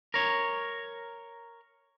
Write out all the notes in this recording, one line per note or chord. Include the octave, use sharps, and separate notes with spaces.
A#4 C#5